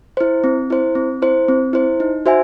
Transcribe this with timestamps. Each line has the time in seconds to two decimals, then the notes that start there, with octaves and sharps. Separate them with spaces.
0.17 E4 C5
0.44 C4
0.70 E4 C5
0.95 C4
1.22 E4 C5
1.48 C4
1.73 E4 C5
2.00 D#4
2.26 F#4 C5 E5 G#5